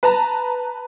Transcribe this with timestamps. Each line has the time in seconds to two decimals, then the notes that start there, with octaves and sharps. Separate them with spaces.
0.03 B4 A5 A#5